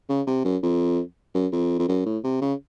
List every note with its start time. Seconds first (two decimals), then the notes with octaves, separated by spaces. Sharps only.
0.09 C#3
0.27 C3
0.44 F#2
0.63 F2
1.34 F#2
1.52 F2
1.79 F2
1.88 F#2
2.05 A2
2.24 C3
2.41 C#3